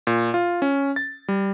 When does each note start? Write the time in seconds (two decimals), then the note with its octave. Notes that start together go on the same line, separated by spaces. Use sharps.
0.07 A#2
0.34 F4
0.62 C#4
0.96 A6
1.28 G3